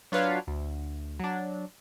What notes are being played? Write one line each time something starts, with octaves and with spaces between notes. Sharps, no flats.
F#3 D4 F4 B4 C#5 F5
D2
F#3 D4